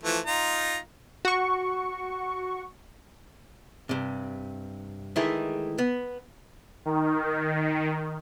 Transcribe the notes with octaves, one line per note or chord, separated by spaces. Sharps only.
E3 F3 A3
D#4 F4 A#5
F#4 C#6
G2 C3
D#3 E3 G#3 A3 E4 G#4
B3
D#3